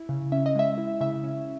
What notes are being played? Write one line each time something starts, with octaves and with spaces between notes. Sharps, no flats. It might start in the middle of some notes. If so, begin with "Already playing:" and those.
Already playing: E4
C#3
C#4 E5
D#5
G#3 E5
E4
C#3 E5
C#4